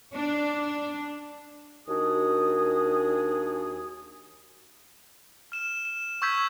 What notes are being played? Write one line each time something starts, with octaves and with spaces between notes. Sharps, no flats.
D4
D#2 D#3 D4 F#4 G#4 D#6
F6 E7
E7
C#6 E6 G6 G#6 B6